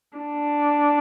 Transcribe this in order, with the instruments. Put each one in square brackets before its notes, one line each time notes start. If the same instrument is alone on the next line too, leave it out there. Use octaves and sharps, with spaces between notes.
[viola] D4